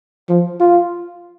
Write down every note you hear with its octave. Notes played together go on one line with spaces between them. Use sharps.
F3
F4